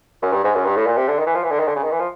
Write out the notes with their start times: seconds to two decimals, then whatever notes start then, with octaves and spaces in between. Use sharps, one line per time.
0.22 F#2
0.33 G2
0.44 G#2
0.55 F#2
0.65 G2
0.76 A2
0.86 A#2
0.97 C3
1.08 D3
1.19 D#3
1.27 E3
1.35 F3
1.43 E3
1.51 D3
1.59 D#3
1.68 D3
1.76 C#3
1.84 D#3
1.91 E3
2.00 F3